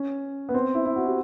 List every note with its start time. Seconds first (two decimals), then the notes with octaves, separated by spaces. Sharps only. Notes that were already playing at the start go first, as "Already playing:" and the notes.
Already playing: C#4
0.49 B3
0.54 C4
0.75 E4
0.85 E4
0.96 F#4
1.06 G4